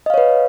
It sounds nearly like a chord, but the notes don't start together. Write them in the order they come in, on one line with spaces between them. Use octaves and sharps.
D#5 F5 C#5 B4